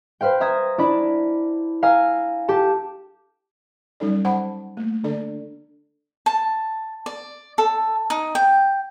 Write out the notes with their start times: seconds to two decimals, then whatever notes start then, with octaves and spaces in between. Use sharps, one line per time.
0.21 B4 C5 F5 G5
0.40 E5 A#5 D#6 G#6
0.78 D4 E4 D5 A#5 B5
1.83 F5 G#5 A#5 E6
2.48 G4 A4 A5
4.00 F#3 G3 C#4 D#4 A4 D5
4.25 C5 F#5 A5 B5
4.77 A3 A#3
5.04 D3 A3 D4 A4 D5
6.26 A5
7.06 D5
7.58 A4
8.10 D#4
8.35 G5